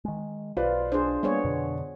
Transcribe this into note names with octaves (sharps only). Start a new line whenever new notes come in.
D#3 G#3
B1 F4 B4 C5 D5
D4 G#4 C5
G3 A#3 B3 G#4 C#5
F2 B2 D3